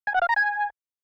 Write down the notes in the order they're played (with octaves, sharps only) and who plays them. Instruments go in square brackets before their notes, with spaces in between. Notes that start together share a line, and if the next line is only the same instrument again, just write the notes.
[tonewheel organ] G#5
F#5
F5
A#5
G#5